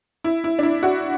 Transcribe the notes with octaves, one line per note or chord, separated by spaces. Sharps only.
E4
E4
D4
E4
F#4